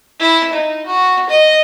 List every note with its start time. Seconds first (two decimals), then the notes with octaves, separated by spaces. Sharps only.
0.19 E4
0.53 D#4
0.86 F#4
1.29 D#5